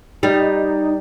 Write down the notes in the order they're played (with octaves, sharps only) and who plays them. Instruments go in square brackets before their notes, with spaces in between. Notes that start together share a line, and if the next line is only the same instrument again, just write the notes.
[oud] G3 [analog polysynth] D#4